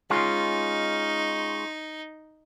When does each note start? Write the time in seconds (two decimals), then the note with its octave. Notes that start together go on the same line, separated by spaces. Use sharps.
0.10 G#3 C#4 D#4 F4